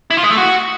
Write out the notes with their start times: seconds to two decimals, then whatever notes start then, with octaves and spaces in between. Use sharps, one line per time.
0.10 E4
0.17 F4
0.24 G#3
0.31 A3
0.37 F#4